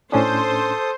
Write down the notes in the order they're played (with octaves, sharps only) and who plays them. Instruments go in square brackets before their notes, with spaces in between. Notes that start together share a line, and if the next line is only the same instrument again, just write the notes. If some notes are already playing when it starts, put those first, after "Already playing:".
[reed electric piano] A2 C#4 D4 [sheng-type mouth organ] A4 D#6 [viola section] C5